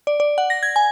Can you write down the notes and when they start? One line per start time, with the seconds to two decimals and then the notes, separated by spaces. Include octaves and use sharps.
0.07 D5
0.20 D5
0.38 F#5
0.50 A#6
0.63 G#6
0.76 G#5